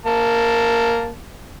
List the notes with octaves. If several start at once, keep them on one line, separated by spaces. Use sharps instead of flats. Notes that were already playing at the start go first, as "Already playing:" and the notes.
A#3 A5